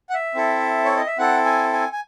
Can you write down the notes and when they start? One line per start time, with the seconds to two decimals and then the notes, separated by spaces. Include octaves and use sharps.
0.10 F#5
0.14 E5
0.35 C4 E4 A4
0.85 C#5
0.97 D#5
1.07 E5
1.18 C4 E4 A4 F#5
1.45 G#5
1.73 G#5
1.92 G#5